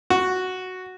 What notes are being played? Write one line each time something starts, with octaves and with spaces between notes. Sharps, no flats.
F#4